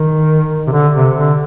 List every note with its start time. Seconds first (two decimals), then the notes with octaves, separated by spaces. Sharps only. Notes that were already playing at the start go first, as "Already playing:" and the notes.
Already playing: D#3
0.67 C3
0.72 D3
0.94 C3
1.17 D3